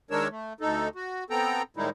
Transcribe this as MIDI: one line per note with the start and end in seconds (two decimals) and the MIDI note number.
0.11 0.28 51
0.11 0.28 56
0.11 0.28 62
0.11 0.28 70
0.11 0.28 73
0.11 0.28 88
0.30 0.53 57
0.61 0.89 38
0.61 0.89 63
0.61 0.89 69
0.95 1.24 66
1.30 1.62 59
1.30 1.62 60
1.30 1.62 69
1.30 1.62 79
1.30 1.62 82
1.77 1.90 45
1.77 1.90 51
1.77 1.90 55
1.77 1.90 56
1.77 1.90 63
1.77 1.90 64